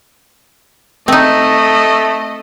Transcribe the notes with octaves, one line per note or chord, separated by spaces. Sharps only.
A3 C4 D#4 D#5